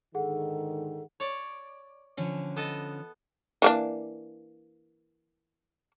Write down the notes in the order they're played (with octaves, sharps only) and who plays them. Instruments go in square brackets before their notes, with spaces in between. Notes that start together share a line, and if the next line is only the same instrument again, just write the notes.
[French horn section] G#2 D3 D#3 [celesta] G#4 F#5 [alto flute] A4
[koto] C#5 D5
[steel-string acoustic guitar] D3 F3 C#4
[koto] B3 A4 D#5
[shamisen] E3 A#3 D4